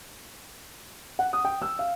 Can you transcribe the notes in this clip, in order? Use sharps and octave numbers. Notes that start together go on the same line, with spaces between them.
F#5
D#6
G5
E6
F5